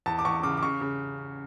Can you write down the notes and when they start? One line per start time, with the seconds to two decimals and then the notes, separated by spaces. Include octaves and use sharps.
0.06 E2 A5
0.19 D6
0.25 E2 C#6
0.43 C#3 D6
0.57 D6
0.62 C#3 C#6
0.81 C#3